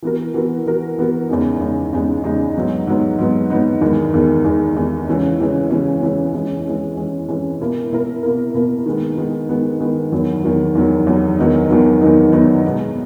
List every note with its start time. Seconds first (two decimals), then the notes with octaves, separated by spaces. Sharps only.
0.03 E3 B3 F#4 A#4
0.34 E3 B3 F#4 A#4
0.66 E3 B3 F#4 A#4
0.98 E3 B3 F#4 A#4
1.29 E2 C#3 G#3 D#4
1.61 E2 C#3 G#3 D#4
1.93 E2 C#3 G#3 D#4
2.24 E2 C#3 G#3 D#4
2.56 G#2 F#3 B3 D#4
2.87 G#2 F#3 B3 D#4
3.18 G#2 F#3 B3 D#4
3.50 G#2 F#3 B3 D#4
3.81 E2 D#3 G#3
4.14 E2 D#3 G#3
4.44 E2 D#3 G#3
4.76 E2 D#3 G#3
5.08 C#3 E3 G#3 C#4
5.40 C#3 E3 G#3 C#4
5.71 C#3 E3 G#3 C#4
6.02 C#3 E3 G#3 C#4
6.34 E3 G#3 C#4
6.66 E3 G#3 C#4
6.97 E3 G#3 C#4
7.28 E3 G#3 C#4
7.60 B2 A#3 E4 A#4
7.92 B2 A#3 E4 A#4
8.23 B2 A#3 E4 A#4
8.54 B2 A#3 E4 A#4
8.86 D#3 G#3 B3
9.18 D#3 G#3 B3
9.49 D#3 G#3 B3
9.81 D#3 G#3 B3
10.12 E2 D#3 F#3
10.43 E2 D#3 F#3
10.75 E2 D#3 F#3
11.07 E2 D#3 F#3
11.38 E2 D#3 F#3 B3 D#4
11.70 E2 D#3 F#3 B3 D#4
12.01 E2 D#3 F#3 B3 D#4
12.33 E2 D#3 F#3 B3 D#4
12.64 B2 G#3 B3